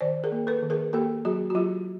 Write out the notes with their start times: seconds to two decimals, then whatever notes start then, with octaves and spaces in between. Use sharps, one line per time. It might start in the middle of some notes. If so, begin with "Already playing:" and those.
0.01 D#3 C5 D5
0.24 G#4 A#4
0.32 A#3
0.47 A4 B4
0.63 D#3
0.70 G#4 A#4
0.93 A#3 G4 A4
1.25 F#3 F#4 G#4
1.50 F#4
1.55 F#3 F4 G4